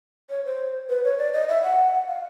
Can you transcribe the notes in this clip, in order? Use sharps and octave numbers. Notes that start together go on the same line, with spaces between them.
C#5
C5
B4
C#5
D5
D#5
E5
F#5
F5